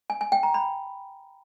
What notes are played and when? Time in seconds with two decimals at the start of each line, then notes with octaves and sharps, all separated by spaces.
0.10 G#5
0.21 G#5
0.32 G5
0.43 A#5
0.54 B5